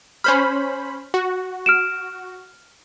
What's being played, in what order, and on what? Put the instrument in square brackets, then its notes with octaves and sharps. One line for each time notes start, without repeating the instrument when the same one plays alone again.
[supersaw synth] C#4 C5 B5 [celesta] F6
[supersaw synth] F#4
[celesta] F6 D7 E7